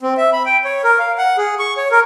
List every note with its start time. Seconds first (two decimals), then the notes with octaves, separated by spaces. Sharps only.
0.02 C4
0.17 E5
0.33 B5
0.45 G5
0.65 C#5
0.84 A#4
0.99 F5
1.18 F#5
1.38 G#4
1.59 C#6
1.77 C#5
1.91 A#4